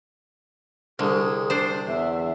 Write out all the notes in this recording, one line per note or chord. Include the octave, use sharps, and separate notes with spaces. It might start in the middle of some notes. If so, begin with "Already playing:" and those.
C2 D3 G#4
D4 C5
E2 E5